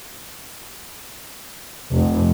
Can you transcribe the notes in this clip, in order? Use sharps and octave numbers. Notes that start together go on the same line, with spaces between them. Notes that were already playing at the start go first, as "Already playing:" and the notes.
F1